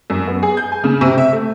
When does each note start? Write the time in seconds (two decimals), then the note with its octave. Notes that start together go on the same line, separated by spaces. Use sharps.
0.10 F#2
0.28 B3
0.43 G#4
0.57 G6
0.72 G#5
0.84 C#3
1.01 C3
1.18 E5
1.32 A3